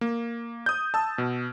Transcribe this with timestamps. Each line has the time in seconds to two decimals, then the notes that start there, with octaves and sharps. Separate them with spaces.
0.01 A#3
0.66 D#6 G6
0.94 A5 E6
1.18 B2